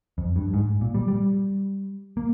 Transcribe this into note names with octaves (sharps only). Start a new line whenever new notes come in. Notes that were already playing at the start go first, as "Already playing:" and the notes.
F2
G2
G#2
A#2
G3
G3
A#3